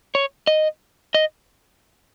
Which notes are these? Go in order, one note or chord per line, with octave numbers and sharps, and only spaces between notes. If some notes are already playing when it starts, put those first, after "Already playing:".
C#5
D#5
D#5